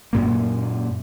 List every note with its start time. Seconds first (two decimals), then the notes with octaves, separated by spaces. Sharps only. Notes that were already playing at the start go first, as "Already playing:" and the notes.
0.13 F#2 A#2 A#3